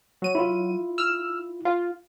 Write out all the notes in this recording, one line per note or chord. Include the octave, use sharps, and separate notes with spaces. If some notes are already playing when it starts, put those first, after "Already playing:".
F#3 D#7
E4 F4
E6 F6
F4